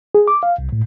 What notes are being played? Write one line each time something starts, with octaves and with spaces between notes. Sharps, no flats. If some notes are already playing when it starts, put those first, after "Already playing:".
G#4
D6
F5
C2
A2